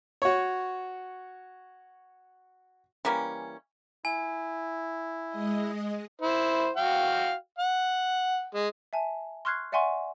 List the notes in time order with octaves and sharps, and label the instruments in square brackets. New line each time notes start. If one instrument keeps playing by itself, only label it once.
[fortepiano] F#4 C#5
[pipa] E3 G3 A#3 C#4
[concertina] E4 [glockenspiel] G#5
[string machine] G#3 D#5
[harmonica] E4 C5
F#4 F5 G5
F#5
G#3
[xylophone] E5 G#5 A5
C6 C#6 F6 F#6 G#6 C7
D5 E5 F#5 G#5 C6 C#6